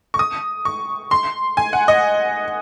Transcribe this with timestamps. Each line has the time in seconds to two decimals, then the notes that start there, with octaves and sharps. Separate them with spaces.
0.14 C#6
0.19 D#6
0.65 C#6
1.11 C6
1.57 G#5
1.73 F#5
1.88 D#5